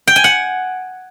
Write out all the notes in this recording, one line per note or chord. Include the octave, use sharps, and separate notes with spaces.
G5
G#5
F#5